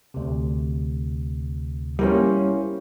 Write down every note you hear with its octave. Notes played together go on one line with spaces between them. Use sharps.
D2 C3
G3 A#3 C#4 E4 C5